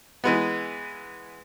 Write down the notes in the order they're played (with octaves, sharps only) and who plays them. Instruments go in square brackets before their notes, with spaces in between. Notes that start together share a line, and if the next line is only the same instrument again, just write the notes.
[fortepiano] E3 G#3 B3